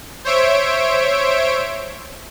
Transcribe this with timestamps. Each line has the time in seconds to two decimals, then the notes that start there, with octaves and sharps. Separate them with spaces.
0.25 C5 C#5 E5 D7